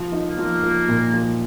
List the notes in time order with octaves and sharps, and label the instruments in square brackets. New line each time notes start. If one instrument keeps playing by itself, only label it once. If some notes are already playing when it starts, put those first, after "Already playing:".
Already playing: [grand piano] F3
D#4
[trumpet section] A#3
[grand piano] F3
F3
A#2
F3